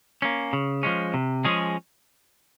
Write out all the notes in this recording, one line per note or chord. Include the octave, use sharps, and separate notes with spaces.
A#3 C#4
C#3
F3 G#3 C#4
C3
F3 G#3 C#4 G#4